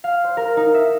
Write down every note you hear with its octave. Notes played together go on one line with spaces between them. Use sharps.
F5
C5
A#4
D#4
E5